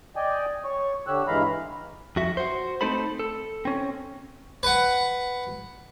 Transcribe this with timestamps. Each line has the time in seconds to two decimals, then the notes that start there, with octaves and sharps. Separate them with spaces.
0.16 D5 D#5 G5 G#5
0.64 C#5 C#6
1.07 D3 G4 C#5 E6 F#6
1.27 G2 E3 G#3 F5 A#5 B5
2.16 F2 F#4 E5
2.37 F#4 C5
2.81 A3 C4 D#4 A4 C5 B5
3.19 A4
3.65 C4 C#4
4.63 B4 F#5